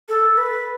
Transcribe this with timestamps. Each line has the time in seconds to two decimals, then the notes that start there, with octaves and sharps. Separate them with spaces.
0.09 A4
0.37 B4